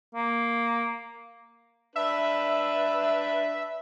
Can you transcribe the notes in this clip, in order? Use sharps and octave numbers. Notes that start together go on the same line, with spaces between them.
A#3
D4 B4 E5